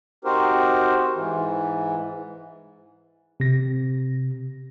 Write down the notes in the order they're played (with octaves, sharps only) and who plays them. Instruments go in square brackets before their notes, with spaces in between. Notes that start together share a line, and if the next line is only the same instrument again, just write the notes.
[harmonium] C4 D#4 F#4 G4 A#4 C5
G#2 E3
[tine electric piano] C3 A#6